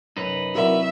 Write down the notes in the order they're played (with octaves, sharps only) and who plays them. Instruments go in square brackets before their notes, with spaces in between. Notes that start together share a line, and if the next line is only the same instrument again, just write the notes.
[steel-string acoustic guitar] F#2 [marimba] C3 [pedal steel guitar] D#4 B4
[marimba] F#3 C4 E4 [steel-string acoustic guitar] F#4 A#4 D5 [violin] E5